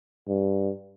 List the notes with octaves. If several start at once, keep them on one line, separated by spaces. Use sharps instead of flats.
G2